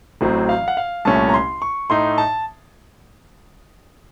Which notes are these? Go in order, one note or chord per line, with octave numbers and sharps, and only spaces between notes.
A1 A2 F#3 C4
F5
F#5
F5
C2 A#2 A3 C#4 A5
A#5
C6
C#6
A2 A3 D#4 C6
A5